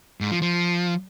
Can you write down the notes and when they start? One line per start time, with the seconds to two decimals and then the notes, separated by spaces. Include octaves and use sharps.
0.21 G#2
0.31 F3
0.42 F3